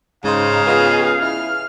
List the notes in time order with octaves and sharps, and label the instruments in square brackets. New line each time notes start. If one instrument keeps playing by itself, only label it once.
[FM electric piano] G#2 C5 [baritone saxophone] C#3 [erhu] D#4 [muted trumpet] F5
[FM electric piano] B3 F4 D#5 [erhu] G#4
[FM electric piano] E4 [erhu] F6